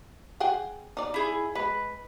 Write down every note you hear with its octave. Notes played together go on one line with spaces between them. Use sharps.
G#4 F#5 G5
D#4 D5
E4 G#4
G#3 B4